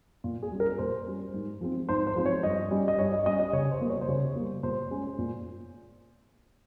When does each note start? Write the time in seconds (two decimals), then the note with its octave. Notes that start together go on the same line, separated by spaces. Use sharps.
0.24 A#2 F4
0.43 G#4
0.51 G3 C#4
0.60 A#4
0.78 A#2 C5
1.06 G3 C#4
1.34 G#2
1.61 F3 G#3 C4
1.89 G#2 C5
2.07 C5
2.16 F3 G#3 C4
2.26 C#5
2.43 G2 D#5
2.71 G3 C#4
2.88 D#5
2.99 G2 C#5
3.12 D#5
3.26 G3 C#4 D#5
3.40 D#5
3.53 C#3 C#5
3.71 C5
3.81 G3 A#3
3.90 C#5
4.01 C5
4.09 C#3 C#5
4.36 G3 A#3
4.63 A#2 C5
4.91 G#3 C#4
5.18 A#2